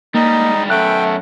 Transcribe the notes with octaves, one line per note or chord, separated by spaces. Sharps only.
G#2 G3 A#3 D#4
F#2 A3 B3 G5 F#6